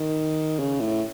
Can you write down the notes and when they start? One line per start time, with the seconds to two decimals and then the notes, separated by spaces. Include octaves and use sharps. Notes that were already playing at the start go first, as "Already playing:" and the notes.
Already playing: D#3
0.59 C#3
0.80 A2